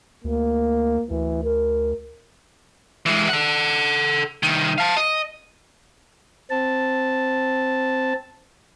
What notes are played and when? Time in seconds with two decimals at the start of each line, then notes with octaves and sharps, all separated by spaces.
0.24 D2 A#3
1.10 D2 E3
1.44 A#4
3.06 E3 G#3
3.29 A4 F#5
4.43 C2 D#3
4.78 F5 A5
4.97 D#5
6.50 C4 A5